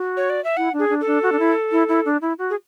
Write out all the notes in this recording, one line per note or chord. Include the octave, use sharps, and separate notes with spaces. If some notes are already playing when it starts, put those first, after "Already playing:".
Already playing: F#4
C#5
D5
E5
E4 F#5
D4
G#4
D4
A4
D4
F#4
D4
E4
E4
E4
D4
E4
F#4
G#4